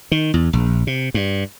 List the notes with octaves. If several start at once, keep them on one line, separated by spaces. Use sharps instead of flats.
D#3
E2
A#1
C3
G2